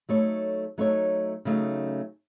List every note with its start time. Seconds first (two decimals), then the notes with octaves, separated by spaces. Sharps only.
0.09 F#3 A3 D#4 A4 C#5
0.78 F#3 A3 D#4 A4 C#5
1.45 C#3 F#3 A3 D#4